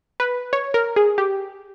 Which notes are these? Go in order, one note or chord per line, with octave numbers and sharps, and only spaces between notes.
B4
C#5
A#4
G#4
G4